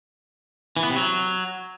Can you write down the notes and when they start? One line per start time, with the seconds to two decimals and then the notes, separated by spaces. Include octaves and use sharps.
0.77 E3
0.83 B3
0.90 C3
0.96 F#3